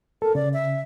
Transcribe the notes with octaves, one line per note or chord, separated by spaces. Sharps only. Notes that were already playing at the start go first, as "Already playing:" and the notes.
A4 A#4
C#3 D5
E5